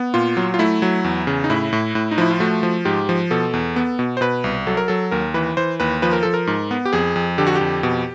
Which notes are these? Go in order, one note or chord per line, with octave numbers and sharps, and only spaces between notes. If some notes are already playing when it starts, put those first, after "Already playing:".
Already playing: B3
A#2 F4
F#3
F4
A3 E4
F#3
E2
C#3
D#4
A2 E4
A2
A2
D#4
F3 E4
F4
A3 F#4
F3
G#2 G4
F3
B2 A4
E2
B3
B2
C5
B2 B4
C2
F#3 A4
A#4
F#3 A4
D#2 A#4
E3 B4
E3 C5
D#2 B4
F3 B4
A#4
F3 A4
A#4
G#2
B3
G4
F2 G#4
F2
D3 G4
F#4
G4
F2
B2